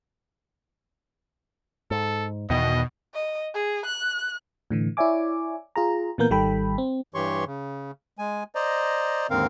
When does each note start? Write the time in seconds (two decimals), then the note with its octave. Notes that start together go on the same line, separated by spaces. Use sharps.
1.91 G#2 A4
2.50 E2 B2 D#3 D#5
3.14 D#5
3.54 G#4
3.85 F#6
4.71 A2 D3 E3
4.97 E4 C#5 D5 E5 G#5 D6
5.76 F4 G#4 A#5
6.18 A#2 E3 A#3 B3 A#4 G6
6.30 G#1 D#3 G3 A4 G5 B5
6.78 C4
7.14 G2 E3 G4 C#5 C6 C#6
7.46 C#3
8.19 G#3 G#5
8.55 C5 D5 D#5 A#5
9.30 D#2 G#2 D3 C4 A#4 F5